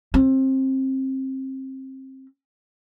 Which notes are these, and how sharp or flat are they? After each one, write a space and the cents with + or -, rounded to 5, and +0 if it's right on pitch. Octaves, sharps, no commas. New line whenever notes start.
C4 +25